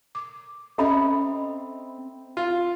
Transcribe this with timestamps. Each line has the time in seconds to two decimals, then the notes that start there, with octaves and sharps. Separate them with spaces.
0.15 D6
0.78 C4 C#4 A4 D#5 E5 B5
2.37 F4